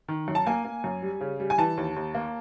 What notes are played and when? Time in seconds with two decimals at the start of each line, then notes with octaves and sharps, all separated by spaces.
0.08 D#3
0.28 F#2
0.35 A5
0.46 A#3 G#5
0.65 A#3
0.84 F#2
1.02 G3
1.20 C#3
1.40 G3
1.50 G#5
1.58 E3 A5
1.77 D#2
1.96 D#2
2.14 A#3